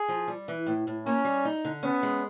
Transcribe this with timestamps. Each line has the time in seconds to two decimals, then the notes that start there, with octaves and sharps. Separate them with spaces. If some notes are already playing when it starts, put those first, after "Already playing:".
Already playing: G#4
0.08 F3
0.28 G3
0.48 E3
0.66 A2
0.87 A2
1.06 A#3 C#4
1.25 G3
1.45 D#4
1.65 D3
1.83 B3 C#4
2.03 G#3